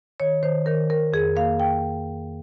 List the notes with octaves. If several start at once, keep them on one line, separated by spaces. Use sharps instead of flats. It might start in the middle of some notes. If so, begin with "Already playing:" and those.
D#3 C#5
D#3 C5
D#3 A#4
D#3 A#4
F2 G#4
A#3 F5
G5